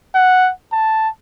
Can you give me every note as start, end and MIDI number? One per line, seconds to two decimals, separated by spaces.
0.15 0.51 78
0.72 1.09 81